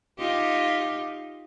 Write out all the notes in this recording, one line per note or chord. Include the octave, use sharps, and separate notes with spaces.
D#4 F4 G4